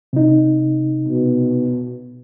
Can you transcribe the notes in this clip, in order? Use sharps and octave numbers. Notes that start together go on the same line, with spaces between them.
C3 D#4
B2